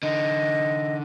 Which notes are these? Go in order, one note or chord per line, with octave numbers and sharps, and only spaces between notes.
D3 D#4 D#5